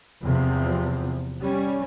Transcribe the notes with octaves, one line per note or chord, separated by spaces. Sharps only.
E2 C3 F3
G3 C#4